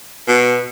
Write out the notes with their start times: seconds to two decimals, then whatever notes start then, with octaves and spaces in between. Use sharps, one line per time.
0.28 B2